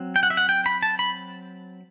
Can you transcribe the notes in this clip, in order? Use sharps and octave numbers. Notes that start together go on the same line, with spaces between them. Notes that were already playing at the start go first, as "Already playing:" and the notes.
Already playing: F#3 C4
G5
F#5
E5
F#5
G5
B5
A5
B5